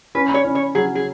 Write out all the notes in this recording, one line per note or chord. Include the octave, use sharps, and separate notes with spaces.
C#4 B4
C#5
C#4
C#5
F#3 G#4
G#4